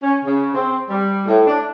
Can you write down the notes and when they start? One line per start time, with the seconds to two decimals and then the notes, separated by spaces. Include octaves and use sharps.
0.03 C#4
0.25 C#3
0.55 C4
0.89 G3
1.27 A2
1.47 D4